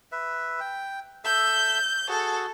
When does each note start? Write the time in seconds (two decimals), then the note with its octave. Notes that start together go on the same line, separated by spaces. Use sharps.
0.12 B4 E5
0.60 G5
1.24 A4 E5 E6 G6
2.09 F#4 G#4 A4